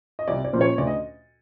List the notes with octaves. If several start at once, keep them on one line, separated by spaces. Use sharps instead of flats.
D#5
C2 D5
D5
A#2 F3 A#3 C#4 C5
C#5
D2 D5
D#5